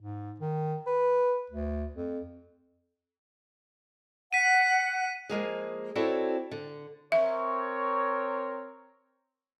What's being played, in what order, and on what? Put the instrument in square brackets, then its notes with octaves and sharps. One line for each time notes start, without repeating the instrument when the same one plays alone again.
[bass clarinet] G#2
D#3
B4
D2
F2
[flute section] F#5 [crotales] B6 D#7
[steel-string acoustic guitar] F3 G#3 A#3 G#4
C4 E4 F#4 A4 C#5 D5
D3
[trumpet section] C4 A#4 C#5 [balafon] E5